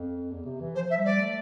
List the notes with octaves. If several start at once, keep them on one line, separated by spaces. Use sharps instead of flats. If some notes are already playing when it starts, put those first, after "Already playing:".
Already playing: F2
E2
C3
E3
F3 C5
E5
G3
D5
A3